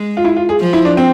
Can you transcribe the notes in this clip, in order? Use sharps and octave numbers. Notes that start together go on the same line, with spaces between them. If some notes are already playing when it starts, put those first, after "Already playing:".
Already playing: G#3
F4
E4
F4
G#4
F3
E4
D4
C4